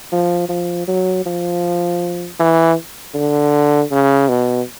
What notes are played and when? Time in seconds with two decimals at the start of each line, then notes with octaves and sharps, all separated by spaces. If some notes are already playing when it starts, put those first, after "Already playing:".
0.12 F3
0.49 F3
0.88 F#3
1.26 F3
2.40 E3
3.14 D3
3.91 C#3
4.29 B2